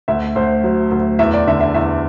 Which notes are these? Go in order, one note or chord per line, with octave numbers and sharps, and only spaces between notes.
D2 E5
D2 C5
F#3
D2
E2 E5
D5
D3 E5
E5
E2 E5